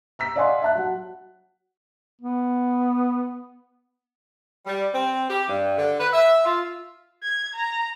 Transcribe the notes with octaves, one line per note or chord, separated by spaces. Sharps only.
A#5 E6 B6
D5 D#5 F5 F#5 G#5 C6
E5 A5 F#6
F#3 F#5
B3
G3
C4
G4
G2
D3
B4
E5
F4
G#6
A#5